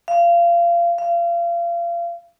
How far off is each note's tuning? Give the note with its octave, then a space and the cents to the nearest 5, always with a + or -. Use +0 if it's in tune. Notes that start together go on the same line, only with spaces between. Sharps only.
F5 -25
F5 -30